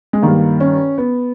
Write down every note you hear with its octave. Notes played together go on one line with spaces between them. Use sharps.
G#3
G2 D#3 A#3
C#4
B3